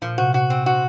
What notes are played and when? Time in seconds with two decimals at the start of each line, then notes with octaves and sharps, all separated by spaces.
0.02 A#2 F3
0.18 C3 F#4
0.34 F#4
0.50 C4
0.66 F#4